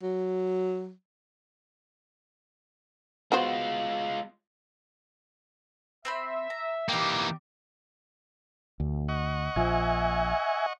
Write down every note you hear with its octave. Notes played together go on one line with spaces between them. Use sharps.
F#3
G#3 B3 F4 F#4 C5
C4 C5 E5 B5
A#5
E3 G3 A#3 D#4 G4 G5 D6
D2
D#5 F#5 C#6
A#1 F3 E5 G#5